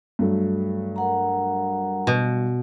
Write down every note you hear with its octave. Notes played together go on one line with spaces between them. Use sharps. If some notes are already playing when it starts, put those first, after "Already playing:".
G2 F#3 A3
A#4 F#5 A#5
B2